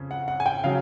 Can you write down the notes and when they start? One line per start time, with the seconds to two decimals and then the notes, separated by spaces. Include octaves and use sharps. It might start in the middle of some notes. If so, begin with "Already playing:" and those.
Already playing: F2 C#3 C#4
0.11 F#5
0.28 F#5
0.40 G#5
0.46 G5
0.64 C#3 F#3 F5